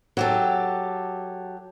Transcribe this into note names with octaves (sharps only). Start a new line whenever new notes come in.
F#3 G4 A4